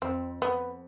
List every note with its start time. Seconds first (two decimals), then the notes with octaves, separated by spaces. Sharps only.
0.02 F2 C4
0.41 F2 B3